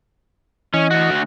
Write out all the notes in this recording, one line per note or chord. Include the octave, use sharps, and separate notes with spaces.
E3 C#4 D#5
D2 F#4